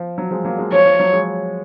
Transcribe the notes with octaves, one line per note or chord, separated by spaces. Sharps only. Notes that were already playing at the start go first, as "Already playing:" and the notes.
Already playing: F3
F#3
F3 G#3
F#3 A#3
F3 G#3
F3 C#5
F3
F#3
F3 G#3